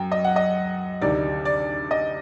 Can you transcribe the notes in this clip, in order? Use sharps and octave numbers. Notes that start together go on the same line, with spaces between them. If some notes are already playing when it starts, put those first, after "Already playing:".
Already playing: F#2 G5
D#5
F#5
D#5
D2 C3 D#3 D5
D5
D#5